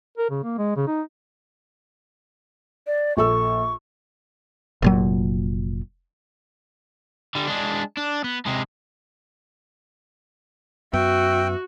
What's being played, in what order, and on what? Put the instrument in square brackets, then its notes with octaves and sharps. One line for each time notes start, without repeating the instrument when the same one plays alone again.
[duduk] A#4
C#3
A#3
G#3
C#3
D#4
[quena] D5
[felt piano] A#1 A4 E6 [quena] C#6
[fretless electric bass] F1 A#2 F#3
[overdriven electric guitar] D3 G3
G#3 D4
D4
B3
C3 G#3
[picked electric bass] F#2 B3 [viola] F#4 [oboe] E5 [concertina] G5